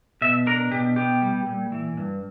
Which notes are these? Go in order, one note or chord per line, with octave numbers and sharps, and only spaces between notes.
B2 E5
D4 A#4
B2 G4
B3 G4
G3
A#2
E3
G2